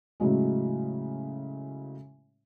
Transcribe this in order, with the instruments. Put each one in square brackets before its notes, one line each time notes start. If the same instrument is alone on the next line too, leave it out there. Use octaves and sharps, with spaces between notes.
[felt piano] A2 C#3 F#3 G#3